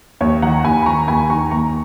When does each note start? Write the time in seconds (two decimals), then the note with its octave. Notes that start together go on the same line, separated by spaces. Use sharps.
0.21 D#2 C#5
0.42 D#3 F#5 A#5
0.64 D#2 G#5 B5
0.83 B5
0.86 D#3 A#5 C#6
1.08 D#2 G#5 B5
1.30 D#3 A#5 C#6
1.51 D#2 A#5 C#6